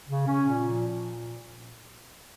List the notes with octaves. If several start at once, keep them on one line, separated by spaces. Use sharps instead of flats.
C#3
C#4
A#2
F3
A#2